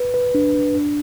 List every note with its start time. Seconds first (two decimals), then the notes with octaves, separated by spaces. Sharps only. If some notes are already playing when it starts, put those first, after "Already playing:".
Already playing: B4
0.14 B4
0.35 D4
0.55 D4
0.75 D4